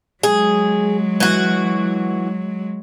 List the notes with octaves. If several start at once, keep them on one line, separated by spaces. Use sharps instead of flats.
F#3 G#3 G#4
E3 F#4